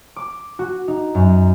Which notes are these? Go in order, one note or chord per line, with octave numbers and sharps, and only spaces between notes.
D6
F#4
D#4
F#2